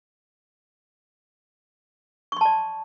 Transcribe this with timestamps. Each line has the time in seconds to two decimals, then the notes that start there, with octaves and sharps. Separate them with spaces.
2.32 C#6
2.37 C6
2.41 A5
2.45 D5